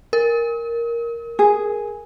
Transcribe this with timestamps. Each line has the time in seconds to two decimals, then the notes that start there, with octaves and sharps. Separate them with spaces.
0.13 A#4
1.39 G#4